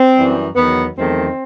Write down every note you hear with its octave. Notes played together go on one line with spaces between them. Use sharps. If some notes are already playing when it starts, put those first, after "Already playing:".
Already playing: C4
F#2 E3 G3
E2 D#3 F#3 B3
E2 D#3 F#3 A3 C4